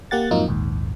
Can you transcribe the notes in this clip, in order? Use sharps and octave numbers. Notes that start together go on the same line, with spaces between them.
A#3 G4 F#5 A6
F2 G#2 F#3 A#3 D#4 F4
A#1 D#2 G#2